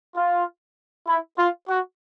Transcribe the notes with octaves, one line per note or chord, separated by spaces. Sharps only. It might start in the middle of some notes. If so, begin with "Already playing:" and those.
F4
E4
F4
F#4